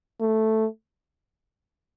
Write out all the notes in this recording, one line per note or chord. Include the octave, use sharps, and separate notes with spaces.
A3